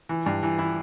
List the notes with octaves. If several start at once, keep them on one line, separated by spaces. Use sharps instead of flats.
E3
G2
E3
E3 E4